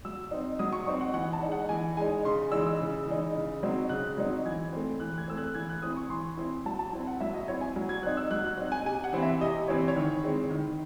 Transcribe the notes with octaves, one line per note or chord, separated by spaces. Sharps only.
F#3 E6
C4 D#4
F#3 D#6
C#6
C4 D#4 C#6
F#5
E3 F#5
A5
G#3 D#4
F#5
E3 G#5
G#3 D#4 G#5
C#3 C6
E3 G#3 D#4 E6
E6
C#3
E3 G#3 D#4
C#3
F#3 C4 D#4
C#3 F#6
F#3 C4 D#4
E3 G#6
A3 C4
E3 F#6
G#6
A3 C4 E6
F#6
E3 G#6
F#6
C4 E4 D#6
C#6
E3 C6
C4 E4
F#3 A5
A5
C4 E4
F#5
F#3 E5
D#5
C4 E4 C#5
G#5
F#3
G#6
C4 D#4 F#6
E6
F#3 F#6
F#6
C4 D#4 F#6
G#5
C3 G#5
F#5
E3 C4 E4
E5
C3 D#5
E3 C4 E4 C#5
C#5
D#3
G#3 C4 E4
D#3